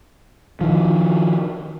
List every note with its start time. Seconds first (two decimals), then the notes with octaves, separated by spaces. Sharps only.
0.61 D#3 F3